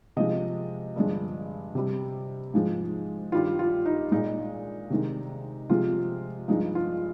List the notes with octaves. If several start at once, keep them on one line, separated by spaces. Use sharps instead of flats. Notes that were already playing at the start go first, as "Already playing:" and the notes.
C3 F3 G#3 D#5
G2 D3 F3 G#3
C3 G3
G#2 F3 G#3
G2 D#3 G3 F4
F4
D#4
A#2 G#3 D#4
C3 D#3 G#3
C3 F3 G#3 F4
G2 F3 G#3 D#4
F4